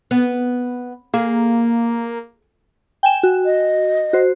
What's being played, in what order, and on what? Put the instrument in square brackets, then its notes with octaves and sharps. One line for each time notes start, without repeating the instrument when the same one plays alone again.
[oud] B3
[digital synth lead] A#3 [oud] G#4
[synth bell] G5 G#5 E7
F#4
[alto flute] D#5
[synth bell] F#4 C5